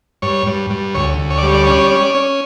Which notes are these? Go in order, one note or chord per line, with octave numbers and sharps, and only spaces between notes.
G2 C#5
G2
G2
D2 C#5
D2
C#5
D5
G3 C#5
D5
C#5
C#4 D5
C#5
D5
C#4 C#5
D5
C#5
C#4